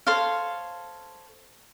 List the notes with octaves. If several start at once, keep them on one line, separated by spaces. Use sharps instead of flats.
A4 C5 C#5 F5